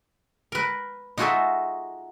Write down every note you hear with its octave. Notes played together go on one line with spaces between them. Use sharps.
A#4 B4
D#4 F4 F#4 G#4 A4 E5